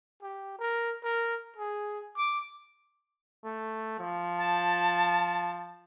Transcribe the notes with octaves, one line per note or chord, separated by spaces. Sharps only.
G4
A#4
A#4
G#4
D6
A3
F3
A5